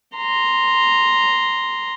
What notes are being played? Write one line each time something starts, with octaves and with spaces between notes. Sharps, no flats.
A#5 C6